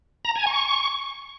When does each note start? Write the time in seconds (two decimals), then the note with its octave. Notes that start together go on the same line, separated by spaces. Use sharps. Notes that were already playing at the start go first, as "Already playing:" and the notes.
0.25 A#5
0.36 G#5
0.47 C#6